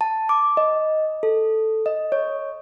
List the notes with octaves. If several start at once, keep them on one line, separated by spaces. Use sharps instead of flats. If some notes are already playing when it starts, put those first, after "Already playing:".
A5
D6
D#5
A4
D#5
C#5